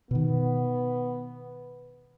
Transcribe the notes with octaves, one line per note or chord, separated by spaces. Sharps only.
B2 D#3 B3